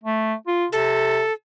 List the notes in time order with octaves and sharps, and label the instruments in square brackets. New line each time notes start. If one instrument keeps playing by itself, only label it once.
[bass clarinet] A3
F4
[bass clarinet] C3 [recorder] A4